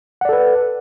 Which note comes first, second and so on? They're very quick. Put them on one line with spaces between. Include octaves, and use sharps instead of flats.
F#5 D5 A4 B4